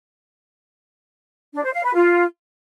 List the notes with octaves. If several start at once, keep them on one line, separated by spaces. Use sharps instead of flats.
D4
C5
F5
B4
F4